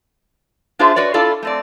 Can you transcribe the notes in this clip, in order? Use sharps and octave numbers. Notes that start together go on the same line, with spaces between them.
D4 F4 G#4 C5 E5
F#4 B4 C#5 D5
D4 E4 F4 A4 D5
A3 C4 D5